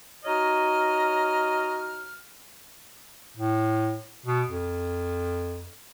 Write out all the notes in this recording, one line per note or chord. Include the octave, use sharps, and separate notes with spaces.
D#4 F#4 C#5 D#5 A#5 F6
A2
B2
F2